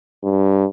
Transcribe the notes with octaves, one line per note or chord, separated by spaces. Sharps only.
G2